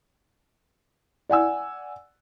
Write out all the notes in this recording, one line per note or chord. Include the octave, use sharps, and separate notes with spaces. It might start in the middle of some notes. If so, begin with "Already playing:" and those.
D5 F#5 G#5 E6